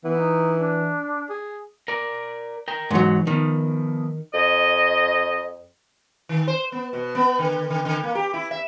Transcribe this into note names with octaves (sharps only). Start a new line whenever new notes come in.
E3 B3
D#4
D4
G#4
A#4 D5
A#4 G5
G#2 E3 F#3
D#3 F3 B3
F2 D#5
D#3
C5
B3
B2
B3
D3
D3
D3
A#3
G4
E4
E5